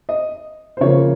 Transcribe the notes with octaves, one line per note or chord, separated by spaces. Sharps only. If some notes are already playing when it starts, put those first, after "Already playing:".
D#5
C5
C#3 F3 A#3 C#5